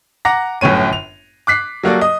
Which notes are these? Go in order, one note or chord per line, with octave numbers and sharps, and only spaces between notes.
F#5 A#5 D6 A#6
G1 F#2 A2 C#5 D#7
F7
D6 F#6 B6 C7
F#3 G3 A#3 F#4 A4 D5
D#5 D#6